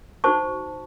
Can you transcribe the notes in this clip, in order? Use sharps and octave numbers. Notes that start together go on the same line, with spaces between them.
D#4 F#4 C5 A5 C#6